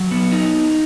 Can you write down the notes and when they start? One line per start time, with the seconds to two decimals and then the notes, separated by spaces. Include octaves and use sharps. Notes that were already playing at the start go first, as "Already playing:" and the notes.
Already playing: F#3
0.11 B3
0.32 D#4